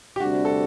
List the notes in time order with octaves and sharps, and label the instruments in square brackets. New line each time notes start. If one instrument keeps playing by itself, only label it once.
[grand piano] G4
[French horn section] D2 C3 G3 D4 [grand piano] F#4
[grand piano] A4